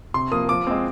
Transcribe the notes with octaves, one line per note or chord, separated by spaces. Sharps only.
C3 C6
F3 A#3 D#6
F3 D6
G#3 C4